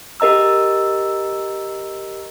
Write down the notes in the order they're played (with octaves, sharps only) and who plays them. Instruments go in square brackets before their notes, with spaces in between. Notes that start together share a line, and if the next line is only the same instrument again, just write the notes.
[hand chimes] G4 A#4 D#5 A#5 E6